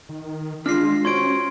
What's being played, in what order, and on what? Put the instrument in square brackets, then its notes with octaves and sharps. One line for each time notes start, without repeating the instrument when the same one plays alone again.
[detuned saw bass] D#3
[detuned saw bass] G#3 [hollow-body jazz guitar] D4 [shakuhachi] F4 [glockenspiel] F6 A#6 C7
[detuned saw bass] C#4 [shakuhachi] F#4 [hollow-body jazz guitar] C5 C#5 [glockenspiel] C6 G#6 D7